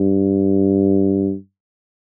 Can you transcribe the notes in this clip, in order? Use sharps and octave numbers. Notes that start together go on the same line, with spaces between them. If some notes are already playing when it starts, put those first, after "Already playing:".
Already playing: G2